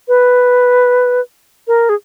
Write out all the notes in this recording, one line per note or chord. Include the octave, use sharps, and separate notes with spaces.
B4
A#4
G#4